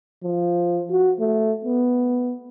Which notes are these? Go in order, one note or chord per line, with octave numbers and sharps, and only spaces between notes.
F3
F#4
A3
B3